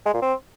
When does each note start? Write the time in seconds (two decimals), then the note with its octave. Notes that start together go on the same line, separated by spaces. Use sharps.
0.06 G#3
0.14 A#2
0.22 C4